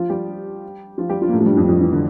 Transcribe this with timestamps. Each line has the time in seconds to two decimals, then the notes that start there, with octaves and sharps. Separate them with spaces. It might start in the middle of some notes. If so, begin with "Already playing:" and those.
Already playing: F3 F4
0.10 G3 G4
0.98 F3 F4
1.09 G3 G4
1.22 F3 F4
1.29 A#3
1.33 A2 A3
1.41 F3
1.45 G2 G3
1.56 F2 F3
1.69 F2 F3
1.81 E3
1.93 D3